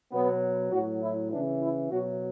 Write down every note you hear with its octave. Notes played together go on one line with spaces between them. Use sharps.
B2 F#3 B3
A2 F#3 F#4
E4
C#3 E3 D4
E4
B2 F#3 F#4